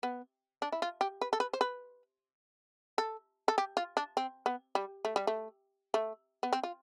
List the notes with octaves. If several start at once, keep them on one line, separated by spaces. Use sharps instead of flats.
B3
D4
E4
F4
G4
B4
A4
B4
C5
B4
A4
A4
G4
F4
D4
C4
B3
G3
A3
G3
A3
A3
B3
C4
F4